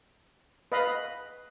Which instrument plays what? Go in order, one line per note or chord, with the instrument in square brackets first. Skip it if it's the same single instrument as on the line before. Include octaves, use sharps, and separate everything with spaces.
[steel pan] B4 D#5 F5 B5